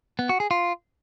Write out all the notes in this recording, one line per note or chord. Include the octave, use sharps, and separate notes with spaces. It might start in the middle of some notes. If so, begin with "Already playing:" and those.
B3
F#4
G#4
F4